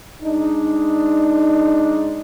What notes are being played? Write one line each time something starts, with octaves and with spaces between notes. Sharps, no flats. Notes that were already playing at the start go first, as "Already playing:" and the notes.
G#3 D4 D#4